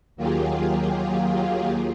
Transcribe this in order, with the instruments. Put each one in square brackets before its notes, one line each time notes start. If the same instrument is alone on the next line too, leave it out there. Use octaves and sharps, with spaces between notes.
[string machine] D#2 F#3 A#3 F4 G4 G#4